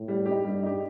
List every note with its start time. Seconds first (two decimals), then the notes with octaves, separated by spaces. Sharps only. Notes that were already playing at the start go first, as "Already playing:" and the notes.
Already playing: A2
0.08 G3
0.26 D#4 G4
0.45 G2 G3
0.63 D#4 G4